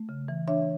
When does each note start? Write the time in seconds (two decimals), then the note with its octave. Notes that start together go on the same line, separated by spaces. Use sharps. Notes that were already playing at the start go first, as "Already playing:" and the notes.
Already playing: A3
0.09 C#3
0.28 E3
0.48 D4 C#5 E5